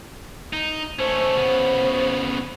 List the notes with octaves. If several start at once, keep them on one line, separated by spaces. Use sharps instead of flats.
D#4
A3 C#4 C5
C#3 B3